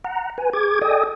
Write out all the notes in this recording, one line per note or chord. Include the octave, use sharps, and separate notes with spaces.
F#5 A#5
B4 G#5
G#4 D6 G#6
A4 D5 D#5 G5 G#5 D#6